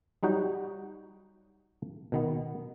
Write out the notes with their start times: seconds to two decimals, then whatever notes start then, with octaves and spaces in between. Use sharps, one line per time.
0.23 F#3 G3 D#4 F#4 G5
2.12 B2 D#3 B3